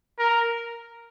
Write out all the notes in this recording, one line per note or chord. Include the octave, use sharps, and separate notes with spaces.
A#4